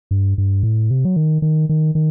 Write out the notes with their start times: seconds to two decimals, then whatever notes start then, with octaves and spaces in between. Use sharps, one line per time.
0.11 G2
0.38 G2
0.63 A2
0.91 C3
1.05 F#3
1.16 D#3
1.42 D#3
1.69 D#3
1.95 D#3